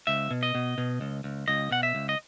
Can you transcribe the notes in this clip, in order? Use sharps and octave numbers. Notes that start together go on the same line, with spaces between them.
C#2 E5
B2
D#5
B2
B2
C#2
C#2
C#2 D#5
B2 F#5
E5
C#2
D#5